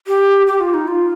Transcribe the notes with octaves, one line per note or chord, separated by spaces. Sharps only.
G4
G4
F4
D#4
F4